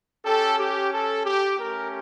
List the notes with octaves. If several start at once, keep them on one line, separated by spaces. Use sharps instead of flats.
C#4 G4 A4
G4
A4
G4
A3 C#4 G4 A#4